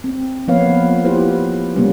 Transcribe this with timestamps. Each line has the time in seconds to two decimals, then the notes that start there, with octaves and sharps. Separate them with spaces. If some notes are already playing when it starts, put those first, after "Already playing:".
0.04 C4
0.47 F3 A#3 B3 B4 C#5 F5
1.05 E4 F4 G4 B4 C5
1.76 C3 G3 G#3 A#3 B3 C#4